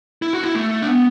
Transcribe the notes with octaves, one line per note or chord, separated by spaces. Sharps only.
E4
F#4
E4
A3
D4
B3